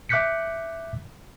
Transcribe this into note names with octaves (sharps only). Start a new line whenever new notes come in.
E5 D6 F#6 G6 B6 C#7